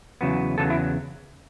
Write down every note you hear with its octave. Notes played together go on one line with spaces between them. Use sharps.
E2 C#3 F#3 B3
E2 C#3 F#3 A4
E4